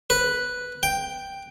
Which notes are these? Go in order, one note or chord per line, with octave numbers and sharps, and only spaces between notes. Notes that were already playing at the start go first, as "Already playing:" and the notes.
B4
G5